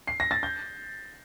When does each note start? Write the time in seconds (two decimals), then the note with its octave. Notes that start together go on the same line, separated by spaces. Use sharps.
0.07 C7
0.20 A#6
0.31 A6
0.43 G6